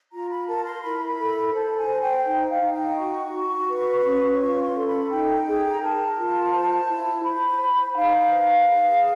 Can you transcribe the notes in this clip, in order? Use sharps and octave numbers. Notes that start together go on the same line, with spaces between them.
F4 A#5
B5
A#4 A5
C6
E4 B5
A4
C5 A5
G#5
C5
G5
D#4 G5
F5
D#4
G5
F#4 C#6
F#4
B4
C#4
F4 C#6
C6
A4
B5
D#4 G5
G#4
A#5
A#4 A5
F4
C5
E4
C5 B5
C5
D#4 F5
B4
G#4